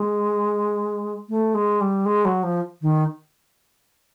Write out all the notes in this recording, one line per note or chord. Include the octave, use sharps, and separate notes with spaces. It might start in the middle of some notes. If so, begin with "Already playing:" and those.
Already playing: G#3
A3
G#3
G3
G#3
F#3
F3
D#3